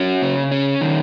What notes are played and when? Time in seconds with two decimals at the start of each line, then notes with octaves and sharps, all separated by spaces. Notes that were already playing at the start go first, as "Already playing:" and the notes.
Already playing: C#4 F#4
0.22 C#3
0.52 C#4
0.81 D#3